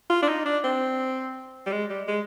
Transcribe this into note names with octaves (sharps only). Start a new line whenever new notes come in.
F4
D4
D#4
D4
C4
G3
G#3
G3
G#3